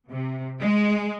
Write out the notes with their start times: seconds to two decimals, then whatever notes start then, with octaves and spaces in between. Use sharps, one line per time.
0.11 C3
0.62 G#3